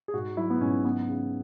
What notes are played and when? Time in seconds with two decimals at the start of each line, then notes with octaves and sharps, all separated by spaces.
0.08 G#4
0.13 G#2 F#4
0.37 F#3 E4
0.50 B3
0.60 G#2 C#4
0.84 C#3 B3
1.09 C#3